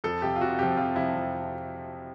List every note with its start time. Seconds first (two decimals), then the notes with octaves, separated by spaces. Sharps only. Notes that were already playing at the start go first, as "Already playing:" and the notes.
0.04 F2 A4
0.22 C3 F3 G4
0.36 F4
0.41 F2 F#4
0.59 C3 F3 G4
0.77 F2 F4
0.95 C3 F3 E4
1.15 F2